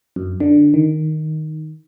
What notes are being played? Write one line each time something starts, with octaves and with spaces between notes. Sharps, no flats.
F#2
D3
D#3